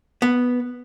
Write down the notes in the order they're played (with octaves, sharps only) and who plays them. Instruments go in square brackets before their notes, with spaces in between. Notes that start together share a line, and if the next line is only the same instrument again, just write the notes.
[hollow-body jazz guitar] B3